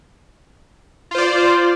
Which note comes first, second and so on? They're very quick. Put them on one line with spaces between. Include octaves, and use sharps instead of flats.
F4 C5 D5